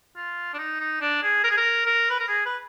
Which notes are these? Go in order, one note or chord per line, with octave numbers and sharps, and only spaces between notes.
F4
D4
D#4
D#4
D4
G#4
A#4
G#4
A#4
A#4
B4
A#4
G#4
B4